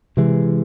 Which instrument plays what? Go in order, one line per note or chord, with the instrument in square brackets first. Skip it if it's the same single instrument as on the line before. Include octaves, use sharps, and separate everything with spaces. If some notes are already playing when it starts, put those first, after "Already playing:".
[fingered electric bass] C3 E3 G#3